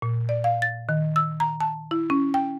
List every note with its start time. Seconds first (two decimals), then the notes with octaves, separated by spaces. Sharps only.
0.02 A#2
0.29 D5
0.44 F5
0.62 A6
0.89 D#3
1.16 E6
1.40 A#5
1.60 A5
1.91 E4
2.10 C#4
2.34 G5